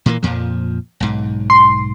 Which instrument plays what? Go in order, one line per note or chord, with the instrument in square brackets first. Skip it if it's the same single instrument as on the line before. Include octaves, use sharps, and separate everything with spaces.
[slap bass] A#2 E3 A#3
F2 A#2 F3
B1 G#2
[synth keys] C6